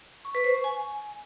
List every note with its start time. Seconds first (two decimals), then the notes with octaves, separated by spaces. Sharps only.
0.25 C#6
0.35 B4
0.44 C5
0.54 C#6
0.64 G#5